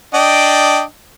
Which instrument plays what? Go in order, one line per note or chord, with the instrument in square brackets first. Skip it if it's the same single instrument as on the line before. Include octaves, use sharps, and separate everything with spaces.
[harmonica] D4 D#5 G5